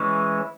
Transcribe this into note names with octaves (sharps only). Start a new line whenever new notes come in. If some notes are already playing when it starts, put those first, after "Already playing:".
Already playing: E3 G#3 C#4 E4